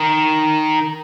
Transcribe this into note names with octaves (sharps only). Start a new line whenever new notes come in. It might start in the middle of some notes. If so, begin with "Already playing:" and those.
Already playing: D#3